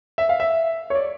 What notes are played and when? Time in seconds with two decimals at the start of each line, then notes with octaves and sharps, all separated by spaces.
0.18 E5
0.29 F5
0.40 E5
0.90 C#5
0.95 D5